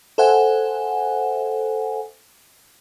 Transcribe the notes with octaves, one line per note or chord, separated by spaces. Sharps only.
A4 C5 E5 F#5 G#5